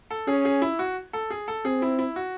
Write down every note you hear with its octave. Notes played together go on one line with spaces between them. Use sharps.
A4
C#4 G#4
G#4
E4
F#4
A4
G#4
A4
C4 G#4
E4
E4
F#4